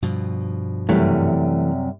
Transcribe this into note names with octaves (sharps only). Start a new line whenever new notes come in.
G2 B2 F3
F#2 C3 E3 G3 A3